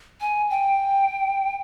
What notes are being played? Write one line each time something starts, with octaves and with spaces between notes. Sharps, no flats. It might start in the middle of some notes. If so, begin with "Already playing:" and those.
G#5
G5